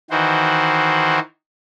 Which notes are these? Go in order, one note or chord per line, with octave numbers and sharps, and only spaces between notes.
D#3 E3 F#4 C5